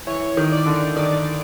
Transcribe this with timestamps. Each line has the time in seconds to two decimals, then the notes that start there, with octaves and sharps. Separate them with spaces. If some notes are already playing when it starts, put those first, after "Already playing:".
0.07 E3 C#5
0.37 D#3
0.52 D5
0.66 D3
0.96 D#3 D5